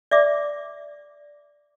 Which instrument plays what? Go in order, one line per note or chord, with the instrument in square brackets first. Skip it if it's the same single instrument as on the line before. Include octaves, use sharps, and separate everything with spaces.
[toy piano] D5 E5 D6